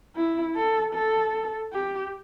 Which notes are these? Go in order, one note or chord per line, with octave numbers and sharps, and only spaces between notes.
E4
A4
A4
G4